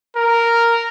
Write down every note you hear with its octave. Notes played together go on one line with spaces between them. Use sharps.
A#4